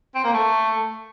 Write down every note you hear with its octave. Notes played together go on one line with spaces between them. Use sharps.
C4
A#3
A3